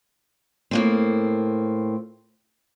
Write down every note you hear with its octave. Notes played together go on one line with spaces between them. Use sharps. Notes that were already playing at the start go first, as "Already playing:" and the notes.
A2 A#3 C4